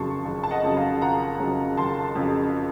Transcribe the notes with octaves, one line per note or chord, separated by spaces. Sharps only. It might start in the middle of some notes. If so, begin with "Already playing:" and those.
Already playing: F#1 F2 C#3 F#3 A5 C6 C#6
F#1
A5
D#5 F#5
F2 C#3 F#3
F5 A5
F#1 F#5 A#5
F2 C#3 F#3
F#1 A5 C6
F2 C#3 F#3